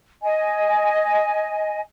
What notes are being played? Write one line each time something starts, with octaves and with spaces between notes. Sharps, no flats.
D#5 G#5